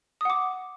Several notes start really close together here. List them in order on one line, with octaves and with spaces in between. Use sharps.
D#6 F#5 D6